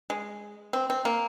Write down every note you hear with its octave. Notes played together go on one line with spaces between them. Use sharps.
G#3
C4
C4
A#3